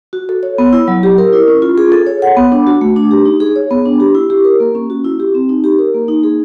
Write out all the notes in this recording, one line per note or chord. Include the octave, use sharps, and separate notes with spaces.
F#4
A4
C#5
B3
E4
F#3
G4
A#4
E4
C#4
F4
G#4
A4
C#5
F#5
B3
D4
F#4
A3
D4
G4
D#4
G#4
C#5
B3
D4
G4
E4
G4
A#4
A#3
C#4
F#4
E4
G4
C4
D#4
G4
A#4
A#3
D#4
G#4